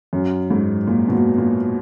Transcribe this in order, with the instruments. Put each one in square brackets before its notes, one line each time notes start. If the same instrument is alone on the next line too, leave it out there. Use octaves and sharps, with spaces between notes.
[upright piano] F#2
G#2
A#2
B2
A#2
A#2